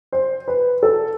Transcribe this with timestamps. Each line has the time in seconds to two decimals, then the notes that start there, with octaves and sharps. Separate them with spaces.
0.12 C5
0.48 B4
0.83 A4